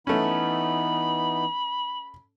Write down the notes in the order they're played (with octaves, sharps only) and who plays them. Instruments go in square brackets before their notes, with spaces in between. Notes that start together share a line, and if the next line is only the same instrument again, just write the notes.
[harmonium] E3 B3 D#4 [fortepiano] A3 C#4 [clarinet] B5